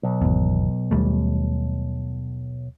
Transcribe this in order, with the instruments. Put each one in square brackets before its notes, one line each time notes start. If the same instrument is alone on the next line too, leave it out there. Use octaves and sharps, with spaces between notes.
[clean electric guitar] B1
[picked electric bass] G#1 E2
D#2 G3 A3